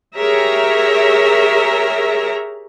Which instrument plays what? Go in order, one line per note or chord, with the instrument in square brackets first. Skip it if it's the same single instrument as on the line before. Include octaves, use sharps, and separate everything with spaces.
[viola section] G4 G#4 A#4 C#5 E5 A#5